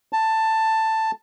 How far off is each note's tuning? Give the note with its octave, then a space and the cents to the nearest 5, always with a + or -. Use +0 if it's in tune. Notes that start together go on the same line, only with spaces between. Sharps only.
A5 +10